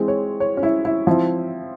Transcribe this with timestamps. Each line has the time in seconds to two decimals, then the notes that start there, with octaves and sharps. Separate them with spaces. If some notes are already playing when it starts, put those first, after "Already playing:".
Already playing: E3 G#3 C4
0.08 C#5
0.40 C#5
0.57 C#4
0.63 E4
0.85 E4
1.07 F3 C4 E4